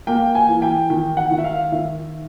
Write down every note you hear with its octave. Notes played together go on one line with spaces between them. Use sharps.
A#3 G5
G#5
E3
G5
D#3 G5
F#5
D#3
E5
F5
D#3 E5